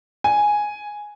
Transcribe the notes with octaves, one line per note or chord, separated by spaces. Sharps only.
G#5